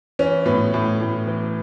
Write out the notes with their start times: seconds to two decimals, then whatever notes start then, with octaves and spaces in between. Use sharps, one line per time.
0.19 E3 C#4
0.46 A2 B3
0.74 A2
1.01 A2
1.27 E3